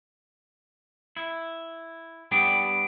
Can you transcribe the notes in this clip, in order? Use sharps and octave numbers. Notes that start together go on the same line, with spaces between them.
E4
G3 B3 D4